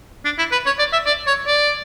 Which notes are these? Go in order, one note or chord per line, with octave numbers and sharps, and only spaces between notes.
D4
E4
B4
C#5
D5
E5
D5
C#5
D5